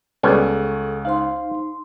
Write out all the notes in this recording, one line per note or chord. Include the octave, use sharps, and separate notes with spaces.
C#2 G3 B3 C#4 G#4 A4 C#6
D#4 C5 F5 C6